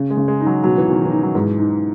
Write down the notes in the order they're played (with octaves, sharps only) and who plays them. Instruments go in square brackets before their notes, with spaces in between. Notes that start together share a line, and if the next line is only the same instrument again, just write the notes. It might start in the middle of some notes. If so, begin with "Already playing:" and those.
Already playing: [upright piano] C#3
[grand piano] G#3
[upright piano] C#3
[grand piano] G#3
[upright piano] D#4
[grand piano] F#3
[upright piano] B2 [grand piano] F#3
[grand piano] E3
[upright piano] B2 [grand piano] D#3
[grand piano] E3
[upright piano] D#4
[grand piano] F#3
[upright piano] G#2 [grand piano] E3
[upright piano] D#4